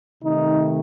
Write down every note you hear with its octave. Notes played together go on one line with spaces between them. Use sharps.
C3 D#3 A3 D#4